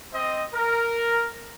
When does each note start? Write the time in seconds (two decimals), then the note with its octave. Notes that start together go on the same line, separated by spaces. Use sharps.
0.12 C4 C5 D#5
0.53 A#4